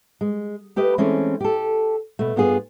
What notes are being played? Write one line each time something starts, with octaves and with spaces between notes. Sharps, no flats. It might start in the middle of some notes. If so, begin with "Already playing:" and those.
G#3
A3 G4 B4 D#5
E3 G#3 A3 C4 C#4
G4 A4
B2 A3
G2 B3 F4 G#4